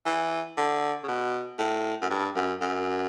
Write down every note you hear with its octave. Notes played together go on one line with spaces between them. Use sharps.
E3
D3
C#3
B2
A2
F#2
G2
F#2
F#2